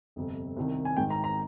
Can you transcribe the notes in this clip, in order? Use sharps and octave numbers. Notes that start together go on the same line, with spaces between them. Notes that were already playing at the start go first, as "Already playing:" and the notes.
G1 F2 C3
C2 C3 D#3
G#5
G#1 G#2 D#3 G5
A#5
A#5